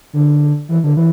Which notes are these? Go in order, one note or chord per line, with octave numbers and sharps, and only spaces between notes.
D3
E3
D3
E3